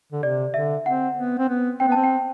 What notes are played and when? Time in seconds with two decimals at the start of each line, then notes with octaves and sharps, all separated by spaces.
0.12 D3
0.23 C3 D5
0.54 D3 E5
0.86 C4 F#5
1.17 B3
1.38 C4
1.49 B3
1.80 C4 G5
1.88 B3
1.92 C4 A5
2.04 G5